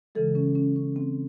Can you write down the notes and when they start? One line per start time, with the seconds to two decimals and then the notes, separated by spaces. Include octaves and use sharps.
0.15 C#3 E3 G#3 A4
0.35 C#4
0.55 C#4
0.76 C#4
0.96 C4